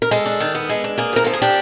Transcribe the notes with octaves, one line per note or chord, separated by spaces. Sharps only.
A#4
G#3 A4
D4
D#3
B3
G#3
D4
A#3 G#4
F3 A#4
F3 A4
G#4
D4 G4